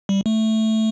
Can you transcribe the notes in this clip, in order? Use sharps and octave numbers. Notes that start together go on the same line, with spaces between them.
G3
A3